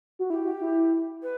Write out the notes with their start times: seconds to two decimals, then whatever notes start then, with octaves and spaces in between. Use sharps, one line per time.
0.19 F#4
0.30 E4 G4
0.45 F#4
0.61 E4
1.22 B4